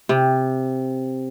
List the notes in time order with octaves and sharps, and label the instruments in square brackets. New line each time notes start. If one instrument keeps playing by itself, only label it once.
[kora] C3